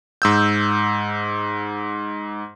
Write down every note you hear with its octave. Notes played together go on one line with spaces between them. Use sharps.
G#2 E6 G6